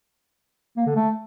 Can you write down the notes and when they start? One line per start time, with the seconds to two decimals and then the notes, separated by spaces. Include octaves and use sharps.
0.77 A#3
0.86 D3
0.95 A3